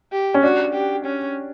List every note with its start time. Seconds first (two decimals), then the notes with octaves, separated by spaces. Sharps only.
0.12 G4
0.34 C#4
0.43 D4 F#4
0.74 G4
1.06 C#4